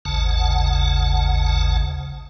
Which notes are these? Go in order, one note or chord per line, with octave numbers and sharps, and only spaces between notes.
G#1 D#2 C#3 F#5 A5